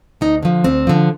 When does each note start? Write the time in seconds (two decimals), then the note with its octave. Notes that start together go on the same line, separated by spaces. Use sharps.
0.21 D2 D#4
0.43 D3 F3
0.64 D2 C4
0.87 D3 F3